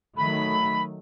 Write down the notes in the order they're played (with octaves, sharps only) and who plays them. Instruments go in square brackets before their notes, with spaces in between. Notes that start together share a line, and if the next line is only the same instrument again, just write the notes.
[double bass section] D#3 F#3 A3 [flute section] B5